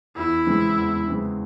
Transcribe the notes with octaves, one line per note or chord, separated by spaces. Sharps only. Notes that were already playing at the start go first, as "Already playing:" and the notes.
E2 E4
C#3 E3 G#3 C4
E2
C#3 E3 G#3 C4